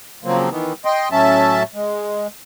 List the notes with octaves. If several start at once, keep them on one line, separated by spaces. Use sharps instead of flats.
C#3 F3 F#3 A#3 C4
D#3 E3 B3
D#5 G5 C6
A2 F#3 C#4 E5 A5
G#3